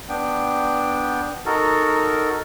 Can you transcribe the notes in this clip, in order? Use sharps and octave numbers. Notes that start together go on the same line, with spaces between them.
B3 D4 G5
D#4 F#4 A4 A#4